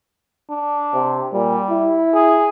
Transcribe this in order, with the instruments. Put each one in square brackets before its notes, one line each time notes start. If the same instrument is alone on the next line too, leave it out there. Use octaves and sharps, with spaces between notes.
[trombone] D4
[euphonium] C3
[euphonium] A#2 [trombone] G3
[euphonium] E4
[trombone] G#4